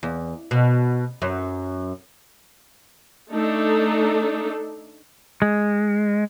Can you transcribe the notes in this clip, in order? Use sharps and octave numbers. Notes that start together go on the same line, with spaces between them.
E2
B2
F#2
A3 D4 D#4 A4
G#3